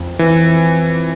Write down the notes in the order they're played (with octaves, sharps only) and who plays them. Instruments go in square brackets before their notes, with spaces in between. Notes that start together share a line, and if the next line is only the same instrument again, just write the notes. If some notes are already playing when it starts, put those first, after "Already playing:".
Already playing: [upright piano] F2
[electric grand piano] E3